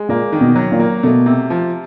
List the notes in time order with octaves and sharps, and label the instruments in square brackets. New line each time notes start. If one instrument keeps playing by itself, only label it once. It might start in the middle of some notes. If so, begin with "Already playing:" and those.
Already playing: [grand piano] G#3
[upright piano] A#2 [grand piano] A#3
[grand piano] D#3
[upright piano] B2
[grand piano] F#3
[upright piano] A#2
[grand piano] A#3
[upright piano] B2 [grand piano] A3
[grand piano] C3
F3